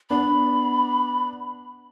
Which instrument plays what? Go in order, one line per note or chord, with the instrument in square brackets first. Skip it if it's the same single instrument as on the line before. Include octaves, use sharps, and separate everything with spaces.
[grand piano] B3 D4 [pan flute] B5